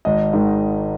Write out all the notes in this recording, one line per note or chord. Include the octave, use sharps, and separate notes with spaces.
G#1 D#5
G#2 D#3